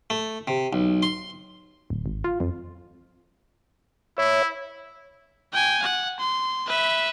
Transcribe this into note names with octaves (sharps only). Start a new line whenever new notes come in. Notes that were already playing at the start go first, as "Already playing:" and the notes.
A3
C3
B1
C6
D1
G#1
F4
F2
E4 C#5 E5
G5 G#5
F#5
C6
B4 E5